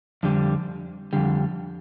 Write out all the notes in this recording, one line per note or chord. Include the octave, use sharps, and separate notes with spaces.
F2 D3 G3
F2 D3 G3